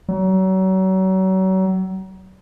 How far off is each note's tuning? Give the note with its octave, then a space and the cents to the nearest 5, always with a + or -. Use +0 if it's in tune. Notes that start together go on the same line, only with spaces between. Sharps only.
F#3 +35